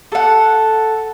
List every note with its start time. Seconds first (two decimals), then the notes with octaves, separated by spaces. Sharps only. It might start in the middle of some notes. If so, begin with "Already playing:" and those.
0.12 A4 F#5